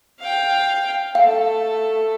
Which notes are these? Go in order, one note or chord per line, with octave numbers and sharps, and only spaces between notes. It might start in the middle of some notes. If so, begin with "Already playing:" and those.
F5 G5
A3 A4 F5